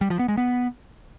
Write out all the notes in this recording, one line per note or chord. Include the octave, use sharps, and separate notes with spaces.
G3
F3
B3
G#3
B3